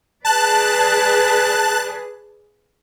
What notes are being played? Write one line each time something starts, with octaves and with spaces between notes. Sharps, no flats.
G#4 B4 D5 A5 F#6